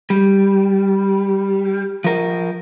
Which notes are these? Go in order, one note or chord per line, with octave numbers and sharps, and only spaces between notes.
G3
F3 A#4